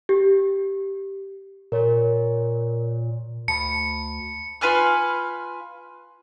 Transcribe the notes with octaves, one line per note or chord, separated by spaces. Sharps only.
G4
A#2 A#4 C#5
D2 A5 B5 C#7
F4 B4 G#5 F6